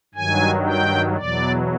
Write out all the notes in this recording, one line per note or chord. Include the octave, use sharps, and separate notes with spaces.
G2 D#3 F#3 G#5
G5
E2 B2 F#3 D5